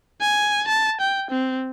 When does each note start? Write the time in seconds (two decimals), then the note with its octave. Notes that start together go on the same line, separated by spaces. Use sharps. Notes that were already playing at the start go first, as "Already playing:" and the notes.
0.21 G#5
0.68 A5
1.01 G5
1.31 C4